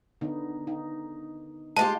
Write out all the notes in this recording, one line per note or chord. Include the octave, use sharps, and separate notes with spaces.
D3 B3 D#4
D#4
G#3 F4 G4 A5